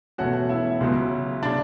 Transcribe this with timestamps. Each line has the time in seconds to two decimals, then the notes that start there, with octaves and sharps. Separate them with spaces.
0.18 E1 E2 B2 A3 C#4 F#4 F#5
0.49 E4 E5
0.80 C#2 C#3 F#3 B3
1.43 C#3 D4 D5